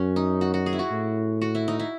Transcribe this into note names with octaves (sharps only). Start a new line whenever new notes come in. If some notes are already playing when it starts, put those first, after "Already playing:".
Already playing: F#2 C#4 F#4
D#4
F#4
F#4
G#4
E4
F#4
A2
F#4
E4
D#4
E4